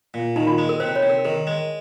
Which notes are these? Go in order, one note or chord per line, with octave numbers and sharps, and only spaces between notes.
A#2
D#3 D#4
F4
G#3
A#4
C3 C5
C#5
C3
A#4
D#3 A#4
G#3